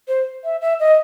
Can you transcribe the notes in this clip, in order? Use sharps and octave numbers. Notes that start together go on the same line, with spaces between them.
C5
E5
E5
D#5